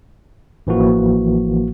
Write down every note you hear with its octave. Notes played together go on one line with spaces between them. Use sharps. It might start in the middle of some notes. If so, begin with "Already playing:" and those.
A1 E3 F3 A#3 F#4